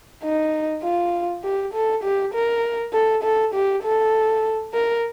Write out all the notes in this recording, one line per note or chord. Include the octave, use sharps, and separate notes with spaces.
D#4
F4
G4
A4
G4
A#4
A4
A4
G4
A4
A#4